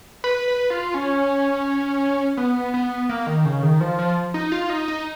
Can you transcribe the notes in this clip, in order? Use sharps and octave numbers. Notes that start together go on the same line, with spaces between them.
B4
B4
F4
C#4
B3
B3
A#3
D#3
C#3
D#3
F3
F3
D#4
F4
D#4
D#4